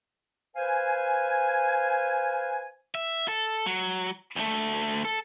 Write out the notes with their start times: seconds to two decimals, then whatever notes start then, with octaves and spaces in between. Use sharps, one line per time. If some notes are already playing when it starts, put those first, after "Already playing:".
0.56 B4 C5 F5 G#5
2.95 E5
3.28 A4
3.66 F#3
4.36 D2 A3
5.05 A4